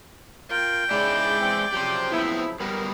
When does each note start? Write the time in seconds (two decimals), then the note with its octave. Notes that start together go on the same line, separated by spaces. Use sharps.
0.51 F4 A#4 G5
0.91 G#2 C#3 G#3 E4 D5
1.40 E3 C4
1.73 C#3 F3 F#3 G4 C5
2.12 B3 C4 E4
2.60 F#3 G3 B3 A4 A#4